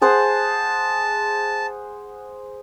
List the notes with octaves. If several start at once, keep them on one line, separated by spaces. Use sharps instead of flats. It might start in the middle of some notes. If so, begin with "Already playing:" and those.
G#4 C5 F#5 A5